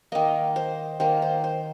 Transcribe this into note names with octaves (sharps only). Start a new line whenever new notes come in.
D#3 A#3 D#5
C5
D#3 A#3 C5
C5
C5